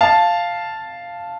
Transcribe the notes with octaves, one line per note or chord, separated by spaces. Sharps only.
F5 A5